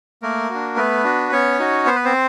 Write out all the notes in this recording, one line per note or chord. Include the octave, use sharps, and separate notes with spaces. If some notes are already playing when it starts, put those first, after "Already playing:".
A3 A#3 A#4
D4 F#4
A3 B3 B4
D4 F#4
B3 C#4 C#5
D#4 F#4
B3 C5
B4
C4 C5